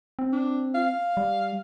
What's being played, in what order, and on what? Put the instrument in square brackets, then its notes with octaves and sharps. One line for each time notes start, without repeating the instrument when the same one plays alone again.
[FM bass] C4
[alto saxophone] D4
F5
[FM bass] G3